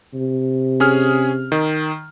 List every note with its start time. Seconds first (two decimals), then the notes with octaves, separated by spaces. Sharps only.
0.14 C3
0.80 C#4 G#4 F6
1.52 D#3